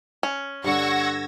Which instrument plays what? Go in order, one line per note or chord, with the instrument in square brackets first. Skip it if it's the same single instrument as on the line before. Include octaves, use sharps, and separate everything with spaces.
[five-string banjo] C#4
[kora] G2 D3 [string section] F#5 C#6 [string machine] E6 G#6 A#6